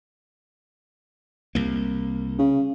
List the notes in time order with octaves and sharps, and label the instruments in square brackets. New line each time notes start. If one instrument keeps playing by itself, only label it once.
[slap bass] C2 A#3
[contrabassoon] C#3